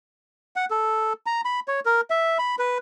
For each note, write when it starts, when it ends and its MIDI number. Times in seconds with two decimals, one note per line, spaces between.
0.56 0.65 78
0.71 1.13 69
1.26 1.41 82
1.45 1.60 83
1.68 1.80 73
1.86 2.01 70
2.10 2.38 76
2.39 2.56 83
2.59 2.78 71